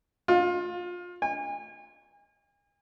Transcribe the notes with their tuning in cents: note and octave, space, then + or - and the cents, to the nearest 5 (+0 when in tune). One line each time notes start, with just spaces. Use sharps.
F4 +25
G#5 -40